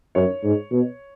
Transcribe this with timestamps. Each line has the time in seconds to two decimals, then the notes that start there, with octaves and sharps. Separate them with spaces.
0.15 F#2 C#5
0.44 G#2
0.72 B2